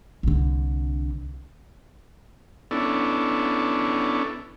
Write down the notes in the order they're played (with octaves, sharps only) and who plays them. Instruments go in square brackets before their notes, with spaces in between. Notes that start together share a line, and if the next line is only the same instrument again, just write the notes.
[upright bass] C2 D3
[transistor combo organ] B3 C#4 D4 E4 A4